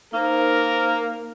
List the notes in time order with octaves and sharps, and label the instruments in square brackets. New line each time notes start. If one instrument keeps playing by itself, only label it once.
[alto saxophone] A#3 [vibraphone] D#4 C5 [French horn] A#4